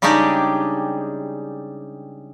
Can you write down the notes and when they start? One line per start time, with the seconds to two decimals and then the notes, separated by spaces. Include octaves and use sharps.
0.02 C#3 G3 G#3 D4 D#4 G4